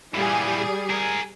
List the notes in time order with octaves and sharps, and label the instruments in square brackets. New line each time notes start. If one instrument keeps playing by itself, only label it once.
[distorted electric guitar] A#2 E3 [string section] G3 G#4
[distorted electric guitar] G#4 A#4